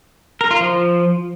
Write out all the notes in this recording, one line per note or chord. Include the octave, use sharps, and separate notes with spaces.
A#4
F4
F3